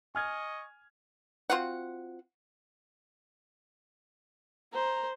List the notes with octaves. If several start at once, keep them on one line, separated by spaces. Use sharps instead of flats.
D#5 G#5 C#6 F6 G#6
C4 F4 F#4 F#5
C5 A#5